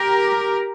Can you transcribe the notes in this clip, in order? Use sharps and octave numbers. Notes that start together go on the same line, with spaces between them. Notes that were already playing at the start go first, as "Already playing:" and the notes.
Already playing: G4 A#4